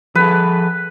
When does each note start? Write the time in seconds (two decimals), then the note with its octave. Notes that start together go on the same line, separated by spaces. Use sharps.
0.15 F3 G#4 A4 B4